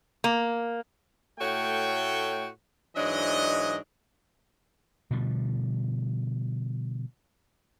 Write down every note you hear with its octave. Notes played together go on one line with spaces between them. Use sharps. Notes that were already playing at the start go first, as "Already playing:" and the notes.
A#3
A2 A3 F#4 C#5 G5
G#2 E3 F#3 D4 D#5
B2 D3 F3 G3